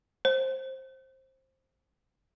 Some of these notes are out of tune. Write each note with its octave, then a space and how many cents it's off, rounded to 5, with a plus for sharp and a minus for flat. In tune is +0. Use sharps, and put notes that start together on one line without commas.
C5 +15